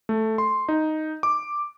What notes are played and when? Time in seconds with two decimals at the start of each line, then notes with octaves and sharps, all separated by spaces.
0.09 A3
0.38 C6
0.68 D#4
1.23 D6